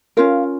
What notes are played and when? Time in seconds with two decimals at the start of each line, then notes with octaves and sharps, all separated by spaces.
0.17 C#4 F4 A#4 F5